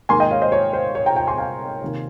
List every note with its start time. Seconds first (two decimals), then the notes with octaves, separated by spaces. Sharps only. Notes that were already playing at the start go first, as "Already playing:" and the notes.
0.09 G#2 D#3 A#3 G#5 C6
0.20 D#5 G5
0.31 C#5 F5
0.42 C5 D#5
0.52 C#5
0.73 C5
0.95 C#5
1.06 G5 A#5
1.16 G5 A#5
1.27 G#5 C6
1.38 F5 G#5
1.82 C3 D#3 A#3